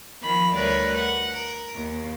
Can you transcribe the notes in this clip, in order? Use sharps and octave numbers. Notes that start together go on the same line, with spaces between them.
D#3 F3 B5 F6
D2 G3 A#4 B4 C#5 D5
F#5
A#4
D#2